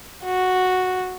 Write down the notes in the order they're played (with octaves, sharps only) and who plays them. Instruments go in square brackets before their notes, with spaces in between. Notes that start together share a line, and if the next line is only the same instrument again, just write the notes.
[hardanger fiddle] F#4